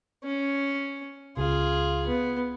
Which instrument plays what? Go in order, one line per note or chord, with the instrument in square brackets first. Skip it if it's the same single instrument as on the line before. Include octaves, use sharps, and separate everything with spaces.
[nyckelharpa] C#4
[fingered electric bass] C#2 C#3 [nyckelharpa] F4 G#4
[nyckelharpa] B3